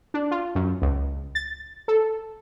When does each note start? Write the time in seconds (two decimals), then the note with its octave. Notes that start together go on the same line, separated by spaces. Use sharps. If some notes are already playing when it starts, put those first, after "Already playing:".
0.14 D4
0.31 F4
0.55 F#2
0.82 C#2
1.35 A6
1.88 A4